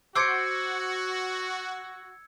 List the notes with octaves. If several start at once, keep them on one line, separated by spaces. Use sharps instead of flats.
F#4 C5 D6 E6 G#6 C#7